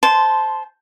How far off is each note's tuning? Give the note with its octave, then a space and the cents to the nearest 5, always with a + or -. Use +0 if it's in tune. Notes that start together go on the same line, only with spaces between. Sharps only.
C5 +0 A5 -15 C6 -10